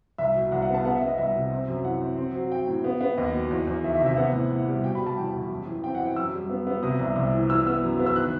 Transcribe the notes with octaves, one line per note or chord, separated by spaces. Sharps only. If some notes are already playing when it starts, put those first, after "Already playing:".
C2 E5
B2
C2 F#5
F#5
B3
A5
B3 F#5
E5
B3
D#5
C2 E5
C3
C4
F#2
E3 F#5
C4
C4
F#3
F#3 G5
A2
B3
B3
D#2 D#5
F#3
E2
E2
D#3 E5
E5
C3
E5
B3 F#5
A2
A2
G3
B2 G5
B5
G3
A5
E2 G5
B2
F#2
E3
C4 G5
F#5
E3
G5
F#2 E6
G3
B3
B3
C3 D#6
C2
C2
E3
E3 E6
B3 E6
F#2
B3
E6
D#3 F#6